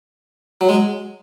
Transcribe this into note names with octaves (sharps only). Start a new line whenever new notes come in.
F#3
G#3